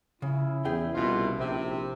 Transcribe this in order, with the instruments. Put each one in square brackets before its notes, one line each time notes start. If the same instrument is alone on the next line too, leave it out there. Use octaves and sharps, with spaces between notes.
[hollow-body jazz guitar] C#3 [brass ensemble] F3 C#4 E4
[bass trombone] E2 [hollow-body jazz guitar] G#4 G5
[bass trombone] C2 [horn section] B2 F4
[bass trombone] A#1 [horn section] C3